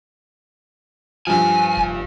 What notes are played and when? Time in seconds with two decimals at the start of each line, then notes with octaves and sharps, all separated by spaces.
1.27 G2 F3 G#5
1.77 F1